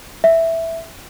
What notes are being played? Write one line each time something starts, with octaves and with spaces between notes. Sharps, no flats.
E5